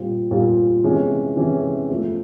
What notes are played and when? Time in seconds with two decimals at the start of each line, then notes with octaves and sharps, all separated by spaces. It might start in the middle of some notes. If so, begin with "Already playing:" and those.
Already playing: A#2 G3 C4 F4
0.31 A#2 G3 C4 F4
0.84 C3 E3 G#3 C#4
1.37 C3 E3 G#3 C#4
1.90 F3 A3 C4